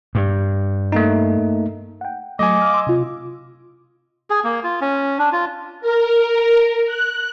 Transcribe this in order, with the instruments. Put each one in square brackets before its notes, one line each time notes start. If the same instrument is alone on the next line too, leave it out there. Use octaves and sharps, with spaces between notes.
[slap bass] G2
[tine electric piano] A3 A#3 D#4
[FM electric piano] F#5 G5
[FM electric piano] F#3 A3 [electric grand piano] D#5 G#5 [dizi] D6
[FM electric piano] F5 D#6 F6
C6 E6
C3 F4
[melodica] G#4
A#3
F4
C#4
D4
F4
[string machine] A#4
F#6